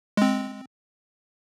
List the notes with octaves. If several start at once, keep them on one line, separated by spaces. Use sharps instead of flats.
G#3 C4